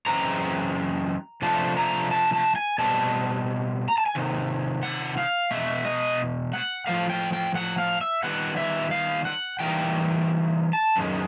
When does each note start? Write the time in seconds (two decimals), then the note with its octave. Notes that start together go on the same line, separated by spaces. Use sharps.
0.06 F#2 C#3 E3 G#3 C4 A#5
1.42 C3 F3 A3 D4 F4 A5
1.77 A#5
2.11 A5
2.33 A5
2.56 G#5
2.78 B2 G3 C4 A5
3.88 A#5
3.98 A5
4.06 G#5
4.15 C3 D#3
4.83 F#5
5.17 F5
5.51 B2 G#3 E5
5.85 D#5
6.53 F#5
6.87 A2 F3 A#3 F5
7.10 G5
7.33 G5
7.55 F#5
7.78 F5
8.01 E5
8.23 D#3 G3 B3 F#5
8.57 E5
8.91 F5
9.25 F#5
9.59 E3 G3 A#3 D#4 G5
10.73 A5
10.96 F#2 D#3 G#3